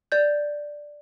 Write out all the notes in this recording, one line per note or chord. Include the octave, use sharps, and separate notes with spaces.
D5 G6